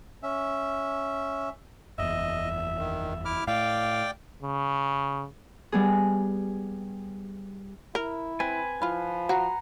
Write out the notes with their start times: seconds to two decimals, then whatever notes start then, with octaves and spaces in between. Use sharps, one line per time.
0.23 C#4 E5
1.99 F#1 E2 D#5 E5
2.78 D#3
3.25 E4 D6 F6
3.48 A2 D5 F5 G5 D6
4.42 C#3
5.72 G3 B3 G#4
7.95 E4 A#4
8.40 C4 B4 G#5
8.82 F3 E4 F4
9.29 F#4 F#5 A#5 C6